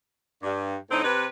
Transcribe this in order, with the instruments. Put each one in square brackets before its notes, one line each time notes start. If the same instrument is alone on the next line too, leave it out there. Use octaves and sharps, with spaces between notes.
[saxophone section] G2
A2 D3 C4 D#4
C3 B4